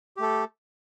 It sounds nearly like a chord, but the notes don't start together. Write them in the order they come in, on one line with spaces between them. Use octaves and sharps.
G4 A3 A4